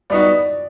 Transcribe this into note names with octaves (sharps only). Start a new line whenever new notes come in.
G3 B3 D#4 F#4 D5